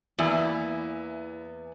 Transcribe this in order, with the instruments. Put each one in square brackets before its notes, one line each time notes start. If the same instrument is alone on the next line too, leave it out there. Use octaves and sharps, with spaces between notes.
[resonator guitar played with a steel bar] E2 [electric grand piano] A#3 B3 [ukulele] E4 [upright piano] D5 G#5